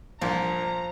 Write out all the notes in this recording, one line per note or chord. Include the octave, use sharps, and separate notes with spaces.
C2 G2 A#2 F3 A#5